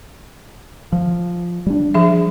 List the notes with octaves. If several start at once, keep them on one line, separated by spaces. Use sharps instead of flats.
F3
G3 D4
F3 G#4 E5